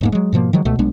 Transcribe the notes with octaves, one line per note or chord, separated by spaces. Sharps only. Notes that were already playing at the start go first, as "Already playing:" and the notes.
D#1 G#2 A#3
F#3 G#3
G#2 B2 F3 A#3
D#3 F3 F#3 G#3
C#2 B2 A3
B1 G#3 B3 D4